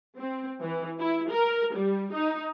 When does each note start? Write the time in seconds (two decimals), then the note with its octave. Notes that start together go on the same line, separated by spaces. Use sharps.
0.18 C4
0.62 E3
0.99 E4
1.30 A#4
1.75 G3
2.13 D#4